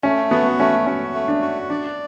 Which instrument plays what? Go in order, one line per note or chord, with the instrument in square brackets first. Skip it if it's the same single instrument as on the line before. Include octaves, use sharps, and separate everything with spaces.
[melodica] A3 [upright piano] C#4
[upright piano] B3 [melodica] F#4
[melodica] A3 [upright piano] C#4
[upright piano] C#4 [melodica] F#4
[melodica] A3
[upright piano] D4
[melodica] F#4
[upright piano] D4 [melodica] D5